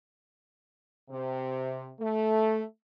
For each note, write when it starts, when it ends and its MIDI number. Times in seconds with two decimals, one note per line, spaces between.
1.10 1.88 48
2.00 2.63 57